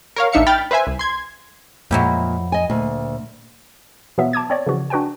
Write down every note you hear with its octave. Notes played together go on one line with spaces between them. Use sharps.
A#4 C#5 F5
A1 D4 D#4 E5 F5 C#7
G5 B5 F6 A6
B4 C5 E5 G#5
C2
C6 G#6
F2 A#2 F#3 G#3 E4 G4
D#5 G#5
D2 A#2
B2 E3 F#3 B3 E5
A5 D6 D#6 G#6
C4 C#5 D5
C#3 E3 F3 F#4
D4 F#4 B4 G5 G#5